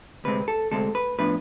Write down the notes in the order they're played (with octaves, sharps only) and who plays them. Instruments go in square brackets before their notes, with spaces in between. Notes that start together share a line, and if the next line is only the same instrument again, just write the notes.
[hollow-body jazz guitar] D2 C3 G#3 C4 B4
A4
D2 C3 G#3 C4 A4
B4
A2 F3 B3 D4 B4